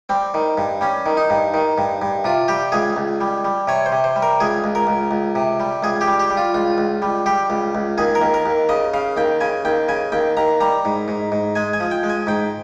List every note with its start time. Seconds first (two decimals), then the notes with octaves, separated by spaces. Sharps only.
0.09 G3 C4
0.34 D#3
0.58 G2
0.81 G3 C#4
1.06 D#3
1.17 D#4
1.30 G2
1.54 D#3
1.78 G2
2.02 G2
2.24 C3 F4
2.48 G3 G4
2.72 C#2 G#4
2.96 C#2
3.21 G3
3.45 G3
3.68 C3 C#5
3.86 C5
3.92 C3
4.04 C5
4.16 G3
4.22 A#4
4.40 C#2 G#4
4.64 C#2
4.75 A#4
4.87 C#2
5.11 C#2
5.35 C3
5.60 G3
5.83 C#2 G#4
6.01 G4
6.07 G3
6.19 G4
6.30 G3
6.37 F4
6.54 C#2 F4
6.78 C#2
7.02 G3
7.26 G3 G4
7.50 C#2
7.75 C#2
7.98 D#2 G#4
8.15 A#4
8.21 D#2
8.34 A#4
8.46 D#2
8.69 C#3 D#5
8.94 C#3 F5
9.17 D#2 G5
9.41 C#3 G#5
9.65 D#2 G5
9.88 C#3 G#5
10.12 D#2 G5
10.37 D#2 A#5
10.61 G3 A#5
10.85 G#2
11.08 G#2
11.32 G#2
11.55 G#3 G#5
11.73 G#5
11.80 F3
11.91 G5
12.03 G#3
12.10 G#5
12.27 G#2 G5